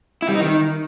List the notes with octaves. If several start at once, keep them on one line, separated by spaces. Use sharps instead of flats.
E4
G3
D#4
D#3